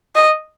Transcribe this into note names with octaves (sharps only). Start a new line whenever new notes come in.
D#5